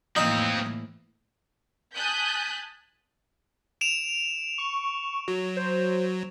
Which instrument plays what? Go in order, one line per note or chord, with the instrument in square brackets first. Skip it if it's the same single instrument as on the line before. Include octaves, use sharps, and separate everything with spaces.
[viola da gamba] A2 E3 A#3 [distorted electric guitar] F3 C4 [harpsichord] D#4
[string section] G#5 A5 D#6 F#6 G6 B6
[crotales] D7 E7 F7
[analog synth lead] C#6
[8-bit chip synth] F#3
[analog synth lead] C5